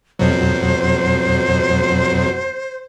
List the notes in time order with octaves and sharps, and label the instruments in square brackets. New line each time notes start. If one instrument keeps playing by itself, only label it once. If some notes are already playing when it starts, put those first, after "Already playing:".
[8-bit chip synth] F2 B2 F#3 [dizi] C5